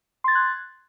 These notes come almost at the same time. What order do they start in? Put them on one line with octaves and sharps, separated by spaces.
C6 A6 G#6 F#6